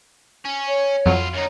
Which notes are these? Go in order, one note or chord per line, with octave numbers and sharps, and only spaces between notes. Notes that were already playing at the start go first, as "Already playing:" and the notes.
C#4
C#5
F2 F#3 B3 F4
F#2 D#4 C#5